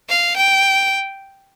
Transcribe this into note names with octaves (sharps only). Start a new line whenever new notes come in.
F5
G5